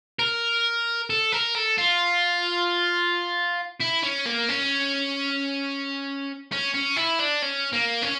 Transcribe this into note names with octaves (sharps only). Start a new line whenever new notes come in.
A#4
A4
A#4
A4
F4
E4
C#4
A#3
C#4
C#4
C#4
E4
D4
C#4
A#3
C#4